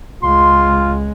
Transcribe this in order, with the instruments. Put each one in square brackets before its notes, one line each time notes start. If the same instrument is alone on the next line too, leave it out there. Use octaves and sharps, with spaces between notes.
[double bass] C#2 G#3 [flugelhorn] F4 [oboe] C6